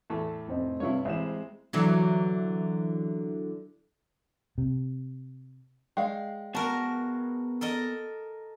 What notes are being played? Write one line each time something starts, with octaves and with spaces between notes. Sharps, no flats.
E2 A2 A3 A4
F1 C4 D#5
G2 C3 E4 F4 C#5
A1 G#3 C4 E4 C5 E5 E7
D3 E3 F#3
C3
G#3 D5 F5 G5
B3 F#4 G#4 A#4 A5
A4 A#4 D#5